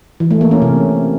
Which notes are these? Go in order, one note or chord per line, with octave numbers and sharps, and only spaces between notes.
E3
A3
A#3
C#4
C3